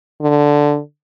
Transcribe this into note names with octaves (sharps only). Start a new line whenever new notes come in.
D3